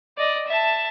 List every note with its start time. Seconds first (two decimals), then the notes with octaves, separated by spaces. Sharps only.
0.18 D5 D#5
0.47 E5 A5